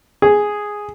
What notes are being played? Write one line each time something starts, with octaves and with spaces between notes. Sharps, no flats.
G#4